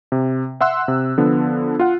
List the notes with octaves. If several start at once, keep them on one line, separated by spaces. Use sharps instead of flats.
C3
E5 F#5 C6 E6 F#6
C3
D3 F3 B3
F4 F#5